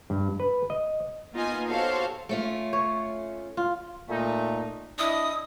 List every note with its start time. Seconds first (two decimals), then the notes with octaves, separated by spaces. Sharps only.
0.10 G2
0.40 B4
0.70 D#5
1.33 A#3 B3 D#4 F4 D#5 G#5
1.68 F#4 G4 A4 C5 C#5 F5
2.29 A3 C#4 F4
2.73 C#5
3.57 F4
4.09 A#2 A3 D#4
4.98 D4 E4 D#5 D#6